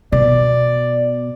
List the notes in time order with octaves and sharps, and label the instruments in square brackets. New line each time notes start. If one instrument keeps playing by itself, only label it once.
[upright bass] B2 [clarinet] D5